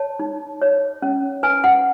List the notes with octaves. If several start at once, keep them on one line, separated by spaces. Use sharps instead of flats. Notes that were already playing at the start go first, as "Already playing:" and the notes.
Already playing: C#5 A5
D#4
C#5
C#4
B4 G#5
F#5